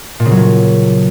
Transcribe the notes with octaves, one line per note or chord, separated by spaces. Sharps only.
A#2
C#3
F#3
A#2